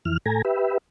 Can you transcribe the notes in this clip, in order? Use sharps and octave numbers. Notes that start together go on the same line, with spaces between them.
F2 E3 F6
A2 A4 G#5 A#5
G4 B4 E5